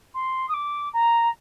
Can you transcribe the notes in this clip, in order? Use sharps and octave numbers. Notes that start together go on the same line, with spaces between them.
C6
D#6
D6
A#5